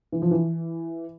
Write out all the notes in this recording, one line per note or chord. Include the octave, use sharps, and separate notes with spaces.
E3
F3
E3